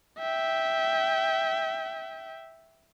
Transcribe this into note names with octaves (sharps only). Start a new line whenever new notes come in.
E5 G5